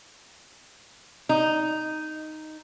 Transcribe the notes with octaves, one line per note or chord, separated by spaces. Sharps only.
D#4